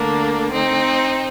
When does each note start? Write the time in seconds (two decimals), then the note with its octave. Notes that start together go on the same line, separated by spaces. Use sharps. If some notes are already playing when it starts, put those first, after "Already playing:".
Already playing: D2 D3 A#3 D4
0.52 C4 D#4